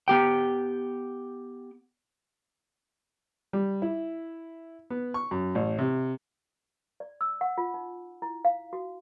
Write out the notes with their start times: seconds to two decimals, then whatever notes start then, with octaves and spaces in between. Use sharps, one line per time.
0.08 B3 G4 G5
3.53 G3
3.82 E4
4.90 B3
5.14 C#6
5.31 F#2
5.55 A1
5.79 C3
7.00 D5
7.21 E6
7.41 F#5
7.58 F4
7.74 D#4
8.22 E4
8.45 F5
8.73 F#4